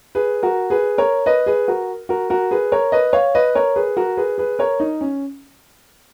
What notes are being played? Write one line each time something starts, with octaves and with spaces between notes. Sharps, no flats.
G#4 B4
F#4 A#4
G#4 B4
A#4 C#5
B4 D#5
G#4 B4
F#4 A#4
F#4 A#4
F#4 A#4
G#4 B4
A#4 C#5
B4 D#5
C#5 F5
B4 D#5
A#4 C#5
G#4 B4
F#4 A#4
G#4 B4
G#4 B4
A#4 C#5
D#4
C#4